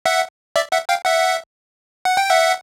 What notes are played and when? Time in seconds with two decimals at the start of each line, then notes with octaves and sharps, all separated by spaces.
0.06 E5 F#5
0.56 D5 E5
0.72 E5 F#5
0.89 F5 G5
1.05 E5 F#5
2.05 F#5
2.17 G5
2.30 E5 F#5